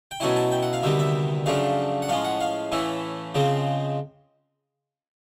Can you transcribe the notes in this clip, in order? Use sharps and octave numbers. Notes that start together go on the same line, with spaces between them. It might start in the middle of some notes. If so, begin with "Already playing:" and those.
G5
B2 F#3 A3 C#4 E4 G#5
A5
G5
F#5
F5
D2 C3 D#3 G3 B3 E5
E5
F#2 C#3 F3 A3 D4 F5
F#5
A2 F3 G#3 C#4 F5
F#5
F5
A2 E3 A3 C#4 E4
C#3 F3 G#3 C4